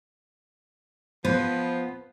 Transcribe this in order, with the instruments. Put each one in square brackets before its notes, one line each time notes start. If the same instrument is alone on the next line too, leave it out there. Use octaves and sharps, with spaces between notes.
[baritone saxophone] F3 [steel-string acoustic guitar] B3 B4 [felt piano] C5